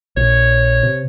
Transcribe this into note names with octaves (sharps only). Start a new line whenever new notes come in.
A#1 C#5
C3